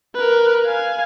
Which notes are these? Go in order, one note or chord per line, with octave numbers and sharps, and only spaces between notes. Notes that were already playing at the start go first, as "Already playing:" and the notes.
A#4 B4
F5 G#5